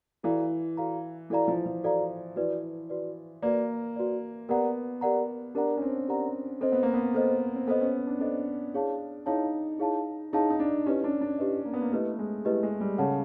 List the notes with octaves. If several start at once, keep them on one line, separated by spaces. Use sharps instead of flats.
E3 F#4 A4 D5 F5 A#5
F#4 A4 D5 F5 A#5
E3 F#4 A4 D5 F5 A#5
F3
F3
F#4 A4 D5 F5 A#5
E3 F#4 B4 D5
F#4 B4 D5
A#3 F#4 B4 D5
F#4 B4 D5
B3 G4 A#4 D5 F#5 A#5
G4 A#4 D5 F#5 A#5
D4 G4 A#4 D5 F#5 A#5
C#4
C4
G4 A#4 D5 F#5 A#5
C4 A4 C5 D#5
B3
A#3
B3
A4 C5 D#5
C4
B3 A4 C5 D#5
C#4
D4
D4 A4 C5 D#5
E4 G#4 C#5 F5 A5
D#4 E4 G#4 C#5 F5 A5
E4 G#4 C#5 F5 A5
D#4 E4 G#4 C#5 F5 A5
D#4
D4
C#4 E4 G4 B4 D#5
D4
D4
E4 G4 B4 D#5
A#3
B3
A#3
A3 E4 G4 B4 D#5
G#3
A3 E4 G4 B4 D#5
G#3
G3
C#3 A4 C#5 F#5 A5